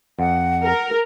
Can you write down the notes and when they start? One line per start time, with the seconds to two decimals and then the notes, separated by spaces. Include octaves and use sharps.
0.19 F2 F#5
0.63 A#4